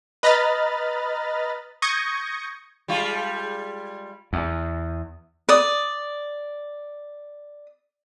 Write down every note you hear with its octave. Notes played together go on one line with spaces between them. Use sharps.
B4 D#5 A#5 B5 F6 A6
C#6 D#6 G6 G#6 A#6 C#7
G3 G#3 F4
E2
D5 D#6